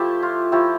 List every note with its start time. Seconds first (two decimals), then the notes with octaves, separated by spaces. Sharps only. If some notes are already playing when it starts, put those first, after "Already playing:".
Already playing: F3 A3 E4 G4
0.23 F4
0.52 F3 A3 E4 G4